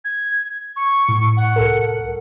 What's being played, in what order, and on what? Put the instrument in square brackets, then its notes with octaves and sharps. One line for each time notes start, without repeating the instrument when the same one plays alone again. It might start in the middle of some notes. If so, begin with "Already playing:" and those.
[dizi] G#6
C#6
[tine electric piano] A2
[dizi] F#5
[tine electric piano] C2 A4 A#4